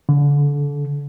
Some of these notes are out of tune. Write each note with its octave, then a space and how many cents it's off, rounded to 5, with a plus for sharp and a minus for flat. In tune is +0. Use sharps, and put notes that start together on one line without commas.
D3 -30